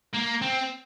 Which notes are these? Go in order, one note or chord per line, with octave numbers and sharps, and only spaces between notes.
A#3
C4